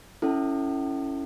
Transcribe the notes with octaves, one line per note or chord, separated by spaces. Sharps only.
C#4 E4 A4